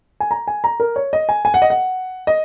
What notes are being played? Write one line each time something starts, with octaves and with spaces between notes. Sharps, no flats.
G#5
A#5
G#5
A#5
A#4
C#5
D#5
G#5
G#5
F#5
D#5
F#5
D#5